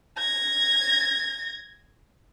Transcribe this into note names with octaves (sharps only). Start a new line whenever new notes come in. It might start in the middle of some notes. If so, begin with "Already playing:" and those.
G#6 A#6